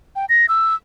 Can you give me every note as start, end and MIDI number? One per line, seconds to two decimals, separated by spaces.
0.16 0.25 79
0.29 0.46 94
0.49 0.75 88